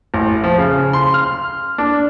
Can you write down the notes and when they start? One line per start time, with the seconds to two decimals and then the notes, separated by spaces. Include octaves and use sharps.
0.14 A1
0.44 F3
0.58 C#3
0.93 C6
1.14 F6
1.78 D4